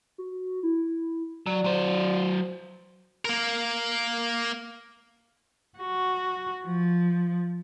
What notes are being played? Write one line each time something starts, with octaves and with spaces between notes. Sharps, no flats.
F#4
E4
F#3 D5
F#3 C5
A#3 A#4
F#4
F3